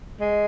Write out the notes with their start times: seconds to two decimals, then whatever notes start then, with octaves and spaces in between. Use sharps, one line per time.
0.20 G#3